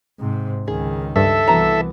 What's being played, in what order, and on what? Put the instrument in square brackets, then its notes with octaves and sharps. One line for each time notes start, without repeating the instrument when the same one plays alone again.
[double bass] G#2 C3
[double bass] C#2 D#3 [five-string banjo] G#4
[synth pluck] G2 [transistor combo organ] A4 E5
[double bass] C2 E3 [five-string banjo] B3 F#4 A#5